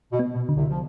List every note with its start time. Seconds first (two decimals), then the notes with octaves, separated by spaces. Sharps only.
0.12 B2
0.19 B3
0.35 B2
0.49 D3
0.56 C2 C3
0.69 F3